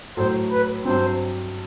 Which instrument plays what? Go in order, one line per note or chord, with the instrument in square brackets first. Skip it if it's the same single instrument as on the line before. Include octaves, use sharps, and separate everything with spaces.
[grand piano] A2 F#3 A3 [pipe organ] C5
[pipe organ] B4
[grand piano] G2 F#3 C4 [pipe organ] C5